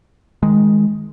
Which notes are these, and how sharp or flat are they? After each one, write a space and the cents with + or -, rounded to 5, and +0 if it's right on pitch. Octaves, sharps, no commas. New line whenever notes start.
D#3 +20 G#3 +0